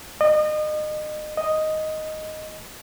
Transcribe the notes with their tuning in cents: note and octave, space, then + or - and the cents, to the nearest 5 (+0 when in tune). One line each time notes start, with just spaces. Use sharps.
D#5 -35
D#5 +0